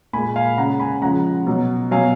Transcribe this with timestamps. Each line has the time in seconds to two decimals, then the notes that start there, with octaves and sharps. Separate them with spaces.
0.13 A#2 G#3 G#5 B5
0.36 F5 G#5
0.57 C#3 G#3 F#5 A#5
0.80 G#5 B5
1.02 C#3 F3 G#3 F#5 A#5
1.47 B2 F#3
1.91 B2 F#3 F5 G#5